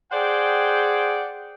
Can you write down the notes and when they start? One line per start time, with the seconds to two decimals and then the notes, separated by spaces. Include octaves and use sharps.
0.11 G#4 C5 D5 F#5 G5